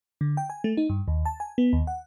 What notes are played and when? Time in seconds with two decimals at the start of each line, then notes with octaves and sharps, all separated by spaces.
0.21 D3
0.37 G5
0.50 G#5
0.64 A3
0.77 D#4
0.90 G2
1.08 D#2
1.25 A5
1.40 G#5
1.58 B3
1.73 D#2
1.87 F#5